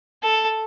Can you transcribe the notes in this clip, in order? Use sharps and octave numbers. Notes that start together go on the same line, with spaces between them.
A4